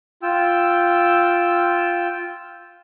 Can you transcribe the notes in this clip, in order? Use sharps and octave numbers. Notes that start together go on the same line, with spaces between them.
F4 G5 E6